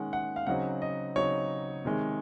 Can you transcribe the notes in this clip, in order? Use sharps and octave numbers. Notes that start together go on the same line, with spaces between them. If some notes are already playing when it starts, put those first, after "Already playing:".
Already playing: D#3 G#3 C#4 F#5
F#5
F5
C#3 F#3 C4 D#4 F#5
D#5
C#3 F#3 C4 D#4 C#5
C3 D#3 G#3